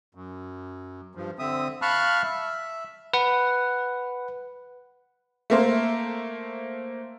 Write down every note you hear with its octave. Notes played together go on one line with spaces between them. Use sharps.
F#2
G2 F3
D3 C4 E5 D#6
F5 A5 B5 C#6 F6 F#6
E5
B4 F#5
A3 A#3 C5